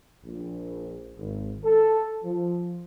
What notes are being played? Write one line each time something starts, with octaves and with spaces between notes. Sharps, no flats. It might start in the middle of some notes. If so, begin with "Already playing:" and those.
A#1
G#1
A4
F3